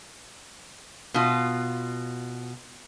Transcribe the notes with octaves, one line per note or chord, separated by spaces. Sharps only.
B2 F4